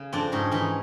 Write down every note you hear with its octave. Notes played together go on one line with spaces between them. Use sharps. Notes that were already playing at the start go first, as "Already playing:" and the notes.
Already playing: C#3
F2 C4 D4
G#2 C#4 D#4
E3 C#4 D#4